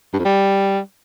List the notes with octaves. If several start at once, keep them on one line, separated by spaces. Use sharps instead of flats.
G2
F2
G3